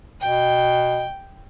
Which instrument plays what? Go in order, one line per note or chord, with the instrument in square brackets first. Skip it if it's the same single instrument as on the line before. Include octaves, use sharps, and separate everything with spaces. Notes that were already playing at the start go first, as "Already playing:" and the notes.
[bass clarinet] B2 [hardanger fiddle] G5